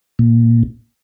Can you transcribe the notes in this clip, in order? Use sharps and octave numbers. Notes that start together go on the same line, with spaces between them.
A#2